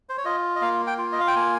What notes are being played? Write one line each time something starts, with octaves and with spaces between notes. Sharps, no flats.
C5
C#5
F4 D#5
D#5
A#3 F5
G5
F4
D#5
F5
G5
A#3 G#5